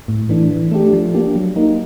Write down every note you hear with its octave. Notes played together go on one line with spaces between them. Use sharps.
A2
E3 A3 D4
E3
A3 D4 G4
F3
A#3 D4 G4
F#3
A#3 D#4